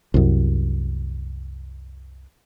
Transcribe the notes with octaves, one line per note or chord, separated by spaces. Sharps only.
C2 F#2